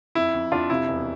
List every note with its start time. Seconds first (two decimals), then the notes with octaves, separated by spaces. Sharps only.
0.15 F2 E4
0.34 F2
0.52 F2 D4 F4
0.70 C3 E4
0.88 E1